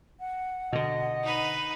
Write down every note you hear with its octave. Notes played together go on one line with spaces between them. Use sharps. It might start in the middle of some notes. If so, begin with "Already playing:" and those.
F#5
B2 D3 D#5
D#4 B4